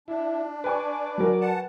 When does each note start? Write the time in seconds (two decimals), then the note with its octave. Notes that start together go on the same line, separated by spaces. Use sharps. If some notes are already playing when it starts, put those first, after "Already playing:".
0.08 D4 E4
0.64 B4 D5 G#5 C#6
1.18 F#3 A#4
1.41 F#5 A5